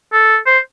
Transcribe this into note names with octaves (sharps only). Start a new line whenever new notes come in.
A4
C5